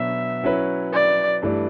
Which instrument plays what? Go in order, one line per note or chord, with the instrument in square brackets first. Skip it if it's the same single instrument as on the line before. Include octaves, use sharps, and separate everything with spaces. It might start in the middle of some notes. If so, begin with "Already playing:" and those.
Already playing: [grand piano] B2 F#3 B3 D4 [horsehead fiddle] E5
[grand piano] F#3 C#4 E4 B4
[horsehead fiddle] D5
[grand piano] G2 E3 A3 D4